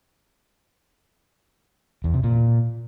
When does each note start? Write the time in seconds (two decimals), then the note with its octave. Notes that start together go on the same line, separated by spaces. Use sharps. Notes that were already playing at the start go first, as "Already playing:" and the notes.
2.04 E2
2.14 C3
2.23 A#2